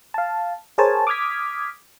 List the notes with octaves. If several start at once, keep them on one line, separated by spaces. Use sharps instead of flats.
F5 A5
G#4 A#4 C5 C#5 G#5 A5
D6 D#6 F6 G#6 B6